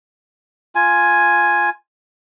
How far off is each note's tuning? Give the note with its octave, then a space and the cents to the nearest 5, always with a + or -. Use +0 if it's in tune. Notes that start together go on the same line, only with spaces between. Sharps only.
F4 +0 G#5 +5